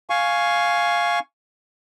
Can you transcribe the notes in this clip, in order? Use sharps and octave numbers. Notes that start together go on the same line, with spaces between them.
F5 G#5 C#6